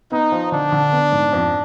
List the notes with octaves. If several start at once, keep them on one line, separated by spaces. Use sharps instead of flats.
B3 D#4
F3
D3 D4
D3
B3
G#2
F2